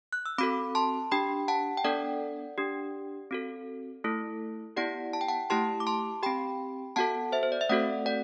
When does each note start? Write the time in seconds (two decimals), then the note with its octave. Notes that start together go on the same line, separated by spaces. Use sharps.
0.13 F#6
0.26 E6
0.38 C4 F#4 A4 B5 D6
0.75 A5 C6
1.11 D4 G4 G5 B5
1.48 F#5 A5
1.77 G5
1.84 B3 D4 A4 D5 F#5
2.58 D4 G4
3.31 C4 F#4 A4
4.04 A3 E4 A4
4.77 B3 E4 G4 D5 F#5
5.13 A5
5.21 G5
5.28 F#5 A5
5.50 A3 E4 G4 A5 C6
5.80 D6
5.87 A5 C6
6.23 C4 G4 G5 B5
6.96 B3 F#4 A4 F#5 A5
7.32 C5 E5
7.43 C5
7.52 D5
7.61 E5
7.69 A3 C4 F#4 A4 D5 F#5
8.06 D5 F#5